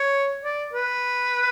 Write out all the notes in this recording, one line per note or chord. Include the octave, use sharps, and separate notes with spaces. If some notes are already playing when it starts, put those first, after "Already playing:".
Already playing: C#5
D5
B4